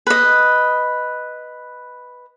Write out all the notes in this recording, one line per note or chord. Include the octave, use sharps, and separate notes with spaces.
B4 D#5